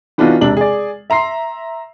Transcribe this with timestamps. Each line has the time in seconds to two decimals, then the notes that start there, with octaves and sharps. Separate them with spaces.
0.18 E3 B3 D4 D#4 F4 F#4
0.41 E1 C3 D4 F#7
0.57 G#4 D5
1.10 E5 A#5 C6 C7